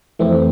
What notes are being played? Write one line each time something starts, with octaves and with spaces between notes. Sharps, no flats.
F2 E3 A3 C4